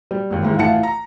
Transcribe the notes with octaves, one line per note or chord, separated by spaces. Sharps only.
G3
G#1 D#2
D#2 G#2 E3
A1 E3 F4 F#5 A5 C#7
A#5